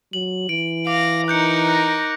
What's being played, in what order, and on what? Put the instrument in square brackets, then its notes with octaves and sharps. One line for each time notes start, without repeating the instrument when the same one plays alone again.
[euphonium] F#3 [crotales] F#7
[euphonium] E3 [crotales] D7
[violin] F5 A#6 [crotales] D6
[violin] D#4 A#4 [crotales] F#6 G6 C#7
[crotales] F#6 A#6